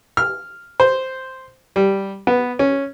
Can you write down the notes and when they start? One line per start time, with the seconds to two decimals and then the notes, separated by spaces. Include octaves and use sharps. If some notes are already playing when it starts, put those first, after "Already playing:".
0.17 F6
0.80 C5
1.76 G3
2.27 B3
2.59 C#4